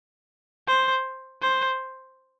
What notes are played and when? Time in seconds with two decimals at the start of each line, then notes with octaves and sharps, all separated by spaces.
0.68 C5
1.42 C5